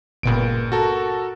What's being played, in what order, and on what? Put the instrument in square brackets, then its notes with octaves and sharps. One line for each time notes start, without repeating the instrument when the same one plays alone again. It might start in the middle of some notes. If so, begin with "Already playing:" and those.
[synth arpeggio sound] G1 A#2 B3 [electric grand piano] C#2 D7
[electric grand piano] F#4 A4 A#4